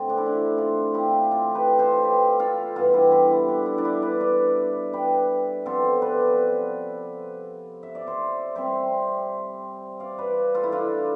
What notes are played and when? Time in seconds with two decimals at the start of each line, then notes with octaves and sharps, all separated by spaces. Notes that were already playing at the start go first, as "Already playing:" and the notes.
Already playing: D3 A3 C4
0.10 D4
0.18 E4
0.26 D4
0.58 D4 F4
0.94 E4 G4
1.31 F4 A4
1.55 G4 B4
1.79 A4 C5
2.04 G4 B4
2.40 F4 A4
2.75 G2 E3 B3 F4 A4
2.93 E4 G4
3.12 E4 G4
3.31 E4
3.48 D4
3.66 E4
3.78 D4
3.85 E4
4.02 B4 D5
4.21 B4 D5
4.93 G4 B4
5.66 C3 F3 B3 A4 C5
6.02 B4 D5
7.83 E5
7.95 D5
8.07 C5 E5
8.56 C3 G3 C4 C5 E5
10.00 D5 F5
10.18 B4 D5
10.54 F4 A4
10.64 E4
10.72 D4 F4